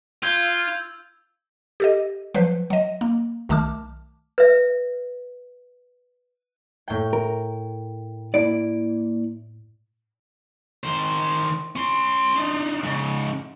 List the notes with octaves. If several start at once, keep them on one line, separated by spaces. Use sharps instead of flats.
F4 E6 G6 G#6
G4 A4 D#5
F3 F#3 B4 C5
F#3 D#5
A#3
B1 D#3 A3 A5 D6 F6
B4 E5
A2 G5
A#4
A#3 E4 D5 D7
D#3 C5
C#4 C6
D4 D#4
G#2 C#3